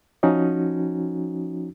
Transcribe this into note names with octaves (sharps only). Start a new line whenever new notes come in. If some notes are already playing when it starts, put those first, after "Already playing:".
F3 C#4 D#4 F#4